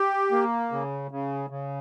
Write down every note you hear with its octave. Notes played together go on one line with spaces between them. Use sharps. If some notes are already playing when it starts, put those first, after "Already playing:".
Already playing: G4
A#3
C#3
C#3
C#3